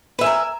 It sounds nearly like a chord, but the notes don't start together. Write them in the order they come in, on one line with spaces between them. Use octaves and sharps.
B4 E5 G#5 A#4